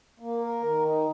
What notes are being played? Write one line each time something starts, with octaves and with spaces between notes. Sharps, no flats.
A#3
A#4
D#3
D#4